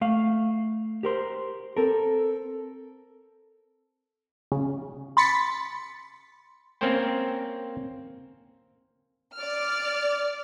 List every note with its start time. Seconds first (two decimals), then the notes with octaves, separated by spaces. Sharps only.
0.01 A3 F5
1.03 G4 A#4 C5
1.77 C4 A4 A#4
4.52 C#3
5.17 B5 C6 A6 B6 C#7
6.81 A#3 C4 C#4 A#4 C5 G5
9.36 D5 F6